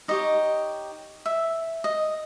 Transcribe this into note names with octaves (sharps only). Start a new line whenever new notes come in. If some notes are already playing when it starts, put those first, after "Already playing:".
D#4 G4 C#5 D#5
E5
D#5